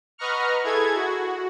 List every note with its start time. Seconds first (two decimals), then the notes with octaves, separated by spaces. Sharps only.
0.18 B4 D#5 F#5 A#5 C#6 F6
0.64 E4 G#4 A4 G#6
0.95 F#4